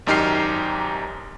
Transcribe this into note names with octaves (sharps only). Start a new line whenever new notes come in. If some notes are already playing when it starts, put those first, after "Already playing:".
G#1 F#2 D#4 G4 F6 C7